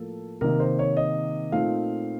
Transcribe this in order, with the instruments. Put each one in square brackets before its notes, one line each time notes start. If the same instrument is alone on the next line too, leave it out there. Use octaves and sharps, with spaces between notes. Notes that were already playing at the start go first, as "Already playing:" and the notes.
Already playing: [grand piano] A2 F3 A#3 A4
C3 D#3 A#3 A#4
C5
C#5
D#5
A#2 A3 C4 D#4 F5